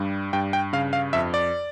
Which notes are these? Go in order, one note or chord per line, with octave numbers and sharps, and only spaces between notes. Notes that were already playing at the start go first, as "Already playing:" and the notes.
Already playing: G2 G3
G2 G5
G5
C#3 F5
F5
F2 E5
D5